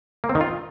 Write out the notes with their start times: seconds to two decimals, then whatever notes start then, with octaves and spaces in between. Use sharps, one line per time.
0.24 A#3
0.29 C4
0.35 D#3
0.41 F4